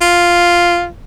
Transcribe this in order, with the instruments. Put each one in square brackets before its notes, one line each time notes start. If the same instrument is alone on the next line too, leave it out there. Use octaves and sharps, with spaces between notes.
[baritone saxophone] F4